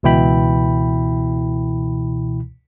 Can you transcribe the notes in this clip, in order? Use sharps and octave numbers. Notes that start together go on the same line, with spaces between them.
C#2 B2 E3 E4 G5 B5